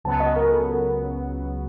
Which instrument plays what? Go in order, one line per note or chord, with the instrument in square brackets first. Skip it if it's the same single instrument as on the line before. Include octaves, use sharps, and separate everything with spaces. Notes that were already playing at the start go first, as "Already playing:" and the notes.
[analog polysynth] C#2 C#3 F#3 B3 [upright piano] A5
[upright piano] D#5
A#4
A4
A#4